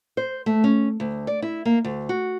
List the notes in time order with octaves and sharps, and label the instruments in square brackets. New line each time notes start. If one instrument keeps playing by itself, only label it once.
[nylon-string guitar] C5
A3
C#4
D2
D5
E4
A#3
D2
F#4